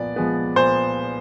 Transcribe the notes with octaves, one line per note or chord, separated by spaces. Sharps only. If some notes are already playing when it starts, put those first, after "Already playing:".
Already playing: A#2 F3 B3 D5
F3 G#3 B3
A#2 C5